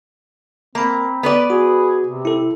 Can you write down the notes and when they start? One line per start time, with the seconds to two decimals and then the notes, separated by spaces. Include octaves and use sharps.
0.75 A#3 C4 A#5 B5
1.23 B3 B4 D5
1.50 F#4 G#4
2.05 C3
2.25 E4 A4